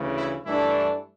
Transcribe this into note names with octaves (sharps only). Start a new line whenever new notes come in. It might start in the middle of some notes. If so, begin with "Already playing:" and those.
Already playing: D2 C#3 E3
E4
G2 E3 A3 D4 E4